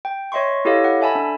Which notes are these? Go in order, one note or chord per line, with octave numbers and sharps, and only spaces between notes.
G5
C#5 D#5 E5 C6 C#6
E4 G4 A4 C#5 D#5 F5
F#5
A4 E5 G#5 A5 B5
D4